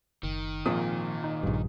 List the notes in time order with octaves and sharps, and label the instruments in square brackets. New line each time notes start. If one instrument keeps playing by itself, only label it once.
[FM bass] F#1 [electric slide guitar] D#3
[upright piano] G#1 A#2 D#6 [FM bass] F3
[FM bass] D#4
[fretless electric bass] A#1 G2